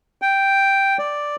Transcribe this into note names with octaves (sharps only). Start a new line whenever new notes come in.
G5
D5